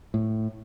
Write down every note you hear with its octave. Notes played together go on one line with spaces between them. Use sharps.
A2